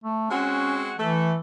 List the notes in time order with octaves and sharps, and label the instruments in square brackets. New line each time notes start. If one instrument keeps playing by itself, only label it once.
[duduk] A3
[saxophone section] G#3 C4 F#4 [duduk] C#4
[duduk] E3 [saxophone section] A3